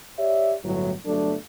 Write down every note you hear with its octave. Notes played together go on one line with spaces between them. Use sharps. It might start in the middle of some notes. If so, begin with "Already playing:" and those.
G4 C#5 D5 E5
G1 A2 F#3
G1 F#3 A3 D4 A4